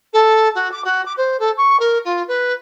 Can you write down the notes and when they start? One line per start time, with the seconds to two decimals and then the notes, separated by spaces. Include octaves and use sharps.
0.13 A4
0.55 F#4
0.71 D6
0.84 F#4
1.05 D6
1.17 C5
1.39 A4
1.57 C#6
1.79 A#4
2.04 F4
2.27 B4